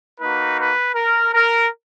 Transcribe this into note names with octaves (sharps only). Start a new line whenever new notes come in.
A#3 D#4 F#4 B4
B4
A#4
A#4